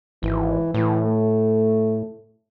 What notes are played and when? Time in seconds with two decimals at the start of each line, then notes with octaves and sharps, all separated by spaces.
0.23 G#1 E3
0.74 A2 E3
1.06 A3